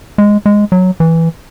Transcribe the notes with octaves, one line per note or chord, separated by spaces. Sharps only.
G#3
G#3
F#3
E3